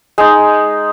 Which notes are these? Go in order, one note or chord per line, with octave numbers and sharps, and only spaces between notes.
G#3 D#4